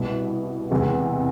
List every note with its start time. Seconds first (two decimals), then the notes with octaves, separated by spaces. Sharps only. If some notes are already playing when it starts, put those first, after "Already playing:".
Already playing: C2 B2 B3 E4
0.71 E2 C3 G#3